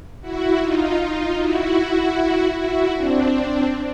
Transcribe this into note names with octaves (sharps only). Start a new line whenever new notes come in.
E4 F#4
D#4 F4
D#4 F4
E4 F#4
E4 F#4
C4 D4